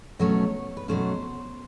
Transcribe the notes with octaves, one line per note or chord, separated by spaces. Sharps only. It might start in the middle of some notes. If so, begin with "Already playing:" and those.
B2 F#3 A3 C#4 C#5
B4
B2 F#3 A3 C#4 C5